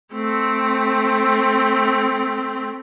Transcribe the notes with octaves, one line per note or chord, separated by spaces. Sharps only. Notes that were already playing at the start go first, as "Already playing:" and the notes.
A3 C4